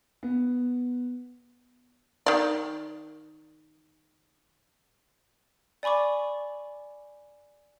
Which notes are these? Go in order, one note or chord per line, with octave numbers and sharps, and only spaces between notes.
B3
D#3 D5
D5 G#5 B5 C#6 D6